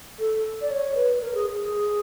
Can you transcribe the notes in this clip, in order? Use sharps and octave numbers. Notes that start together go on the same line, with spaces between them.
A4
D5
C#5
B4
A#4
G#4
G#4